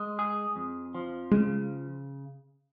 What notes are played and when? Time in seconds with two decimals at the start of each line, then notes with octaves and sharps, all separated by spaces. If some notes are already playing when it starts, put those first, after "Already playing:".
Already playing: G#3
0.19 G#4
0.56 F2
0.95 F3
1.32 C#3 G#3